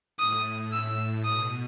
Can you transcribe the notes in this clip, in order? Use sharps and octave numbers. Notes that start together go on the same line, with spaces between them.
A2 D#6
A2 E6
B2 D#6